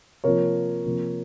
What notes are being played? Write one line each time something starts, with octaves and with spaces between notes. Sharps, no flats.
C3 F3 A#3 A#4 C#5
C3 F3 A#3